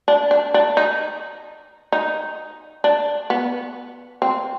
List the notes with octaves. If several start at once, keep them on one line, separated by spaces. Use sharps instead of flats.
D4
D4
D4
D#4
D#4
D4
B3
C4